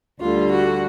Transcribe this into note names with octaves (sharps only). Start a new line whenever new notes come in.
D2 D3 G3 F4
F#4